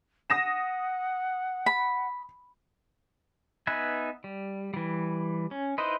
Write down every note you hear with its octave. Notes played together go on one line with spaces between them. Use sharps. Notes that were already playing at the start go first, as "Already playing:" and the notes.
F#5 D#6 A#6 E7
B5
B3 D#4 B4 E5 G#5
G3
E3 G3
C#4
D#4 E4 B4 C5 D#5